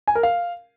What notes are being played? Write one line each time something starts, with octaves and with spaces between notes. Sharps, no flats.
G#5
A#4
F5